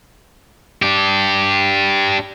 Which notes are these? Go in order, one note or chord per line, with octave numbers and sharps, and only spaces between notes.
D4 G4